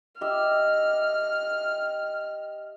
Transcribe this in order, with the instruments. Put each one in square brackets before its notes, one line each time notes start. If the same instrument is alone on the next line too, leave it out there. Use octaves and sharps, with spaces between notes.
[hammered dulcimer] G4 D#5 E5 [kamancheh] F6